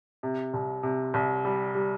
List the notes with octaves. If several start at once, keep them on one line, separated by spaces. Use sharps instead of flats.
C3
C2
C3
C2
G3
G3